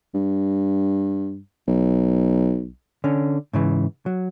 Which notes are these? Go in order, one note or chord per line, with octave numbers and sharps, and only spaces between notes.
G2
B1
D3 C#4
G#2 C#3 E3
F#3